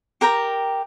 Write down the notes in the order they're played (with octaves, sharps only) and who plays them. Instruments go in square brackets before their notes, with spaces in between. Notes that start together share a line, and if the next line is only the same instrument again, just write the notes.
[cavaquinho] G4 A#4 G5 A#5